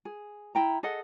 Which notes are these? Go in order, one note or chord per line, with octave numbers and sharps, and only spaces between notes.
G#4
E4 G5 A#5
G#4 A4 D#5 F#5